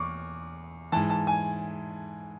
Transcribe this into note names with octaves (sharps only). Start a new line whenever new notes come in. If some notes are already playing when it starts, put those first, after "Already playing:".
Already playing: E2 C#6 D6
G#2 E3 A5
A5
G#5